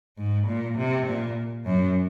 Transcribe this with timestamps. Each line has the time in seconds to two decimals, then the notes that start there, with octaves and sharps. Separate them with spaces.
0.18 G#2
0.47 A#2
0.77 C3
1.07 A#2
1.66 F#2